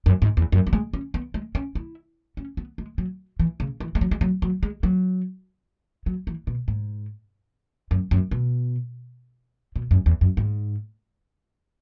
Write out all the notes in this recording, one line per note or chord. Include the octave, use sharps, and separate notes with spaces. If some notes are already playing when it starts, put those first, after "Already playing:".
F#2
G#2
E2
F#2
B3
G#3
C#4
B3
G#3
C#4
E4
C#4
B3
G#3
F#3
E3
C#3
E3
G#3
F#3
G#3
F#3
F#3
G#3
F#3
F#3
E3
B2
G#2
F#2
F#2
B2
B2
F#2
E2
F#2
G#2